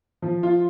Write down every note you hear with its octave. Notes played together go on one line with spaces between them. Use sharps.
F3
F4